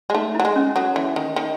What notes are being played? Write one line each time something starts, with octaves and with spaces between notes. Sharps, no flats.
G#3
A3 D#4
E4
F#3
G#3
C#4
F#3 A4
E3
D#3
D#3